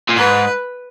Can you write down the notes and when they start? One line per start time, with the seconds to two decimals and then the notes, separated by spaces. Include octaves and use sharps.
0.09 A#2
0.16 G#2 B4